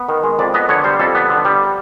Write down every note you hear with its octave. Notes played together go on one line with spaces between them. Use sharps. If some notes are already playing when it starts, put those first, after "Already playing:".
Already playing: B3
D#3
G#3
F2 D5
B3 D#5
D3 C#5
G3 C5
F2 A4
B3
D3
G3